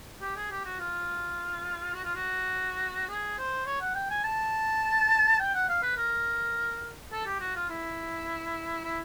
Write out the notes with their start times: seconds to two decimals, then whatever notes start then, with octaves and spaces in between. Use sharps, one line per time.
0.21 G4
0.36 G#4
0.51 G4
0.65 F#4
0.79 F4
1.94 F#4
2.04 F4
2.15 F#4
3.09 G#4
3.39 C5
3.66 C#5
3.81 F#5
3.95 G5
4.10 G#5
4.24 A5
5.39 G5
5.54 F#5
5.69 F5
5.83 B4
5.97 A#4
7.12 A4
7.26 G4
7.40 F#4
7.55 F4
7.69 E4
8.84 E4